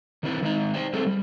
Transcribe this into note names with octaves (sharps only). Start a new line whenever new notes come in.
D#3 E3 C4 D4 E4
D#3 G#3 D#4 A#5
C5 D5 G5
G3 A3 C4 G#4 A4
G3